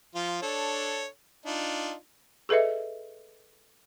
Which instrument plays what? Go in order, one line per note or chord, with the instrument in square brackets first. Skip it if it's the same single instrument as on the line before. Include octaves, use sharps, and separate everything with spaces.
[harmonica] F3 F4
D4 A4 C#5
D4 D#4 F4
[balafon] G#4 A4 B4 D#5 E5